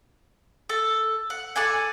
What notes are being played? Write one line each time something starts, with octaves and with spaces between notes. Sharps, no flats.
A4
F#5
A4 D5 F#5 G#5